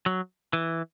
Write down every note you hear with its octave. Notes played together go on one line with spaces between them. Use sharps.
F#3
E3